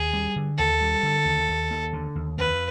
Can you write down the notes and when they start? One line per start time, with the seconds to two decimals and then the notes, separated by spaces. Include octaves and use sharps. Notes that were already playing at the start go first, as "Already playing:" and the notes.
Already playing: D#2 G#4
0.14 G3
0.36 D3
0.58 D#2 A4
0.81 G3
1.03 D3
1.25 D#2
1.49 D#2
1.71 D#2
1.93 D3
2.15 D#2
2.38 F2 B4